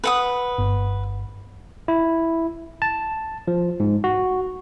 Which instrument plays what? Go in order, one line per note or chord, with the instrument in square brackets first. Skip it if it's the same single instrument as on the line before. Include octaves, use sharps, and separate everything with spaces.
[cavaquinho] B4 F#5 D#6
[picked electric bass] G1
[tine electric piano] E4
A5
F3
G#2
F#4